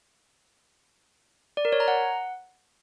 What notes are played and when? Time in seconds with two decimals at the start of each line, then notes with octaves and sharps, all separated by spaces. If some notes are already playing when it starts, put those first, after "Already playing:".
1.57 D5
1.65 A#4
1.72 C#5
1.80 A#5
1.88 F#5